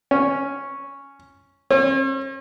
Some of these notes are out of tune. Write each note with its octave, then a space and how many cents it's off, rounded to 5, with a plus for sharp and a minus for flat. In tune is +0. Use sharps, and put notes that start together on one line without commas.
C#4 +0
C#4 -45